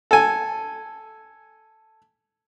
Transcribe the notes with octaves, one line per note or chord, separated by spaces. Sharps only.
A4 G#5